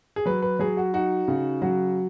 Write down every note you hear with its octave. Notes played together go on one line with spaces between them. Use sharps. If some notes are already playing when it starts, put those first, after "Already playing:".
G#4
F#3 B4
B4
F#3 G#4
F#4
D#4 F#4
C#3
F#3 F#4